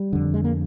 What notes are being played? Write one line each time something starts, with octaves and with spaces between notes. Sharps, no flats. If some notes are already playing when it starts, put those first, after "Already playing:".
Already playing: G3
F2 D3
G#3
A#3